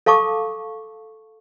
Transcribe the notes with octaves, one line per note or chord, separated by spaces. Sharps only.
A4 F5 A5 C#6 D6